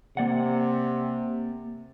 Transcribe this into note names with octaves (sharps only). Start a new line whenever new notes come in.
C3 A#3 D5 F#5